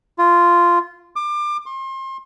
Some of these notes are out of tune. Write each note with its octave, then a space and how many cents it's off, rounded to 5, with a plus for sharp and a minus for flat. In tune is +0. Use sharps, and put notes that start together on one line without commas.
F4 -10
D6 +30
C6 +35